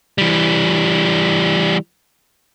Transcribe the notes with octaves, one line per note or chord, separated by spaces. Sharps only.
E3 G3